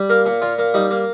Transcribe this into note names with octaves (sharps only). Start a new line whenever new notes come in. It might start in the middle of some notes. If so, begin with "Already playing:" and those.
Already playing: G3
A#3 A#4
A#2
A#2 F4
A#3
G3 D#4
A#3